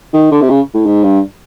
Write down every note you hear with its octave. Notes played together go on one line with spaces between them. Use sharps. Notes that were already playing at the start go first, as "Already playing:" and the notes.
D#3
D3
C3
C#3
A2
G#2
G2